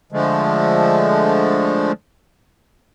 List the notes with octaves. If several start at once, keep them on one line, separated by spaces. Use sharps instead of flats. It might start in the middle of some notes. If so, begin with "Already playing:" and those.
D3 F3 G#3 A3